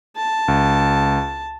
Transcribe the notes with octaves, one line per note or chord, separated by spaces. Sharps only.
A5
C#2